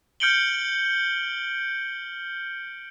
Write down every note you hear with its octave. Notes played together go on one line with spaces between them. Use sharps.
F6 G6 C#7 D7 F#7 G7